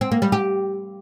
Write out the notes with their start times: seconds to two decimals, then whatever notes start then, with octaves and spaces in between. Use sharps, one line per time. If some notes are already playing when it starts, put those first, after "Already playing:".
0.01 C4
0.12 A#3
0.22 G3
0.32 G4